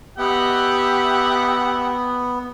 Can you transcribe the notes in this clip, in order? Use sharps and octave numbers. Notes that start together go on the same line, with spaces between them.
B3 G4 D#5 E5 F#5